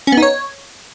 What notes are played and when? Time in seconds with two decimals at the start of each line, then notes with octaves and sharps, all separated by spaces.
0.07 C#4
0.12 B3
0.17 D#4
0.22 C#5